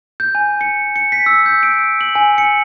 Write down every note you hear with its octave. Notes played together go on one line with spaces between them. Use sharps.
G6
G#5
C#7
C#7
B6
E6
G6
D7
F#7
G#5
C#7